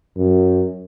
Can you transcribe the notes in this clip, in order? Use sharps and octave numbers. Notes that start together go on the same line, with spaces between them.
F#2